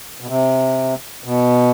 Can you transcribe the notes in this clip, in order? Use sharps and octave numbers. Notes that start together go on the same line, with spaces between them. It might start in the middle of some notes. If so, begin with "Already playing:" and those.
B2
C3
B2